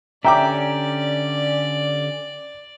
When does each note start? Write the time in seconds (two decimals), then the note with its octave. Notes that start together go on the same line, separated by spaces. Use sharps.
0.25 D3 C#4 G4 D5 E5 G5 A#5 D6